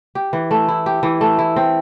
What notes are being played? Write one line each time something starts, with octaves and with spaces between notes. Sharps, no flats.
G4
E3
A3
E4
G4
E3
A3
E4
C4